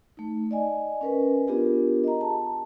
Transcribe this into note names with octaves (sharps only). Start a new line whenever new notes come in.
A3 D#4
D5 D#5 G#5
C#4 A#4 B4
B3 D4 F4 G4 G#4 A#4
D#5 A#5
A5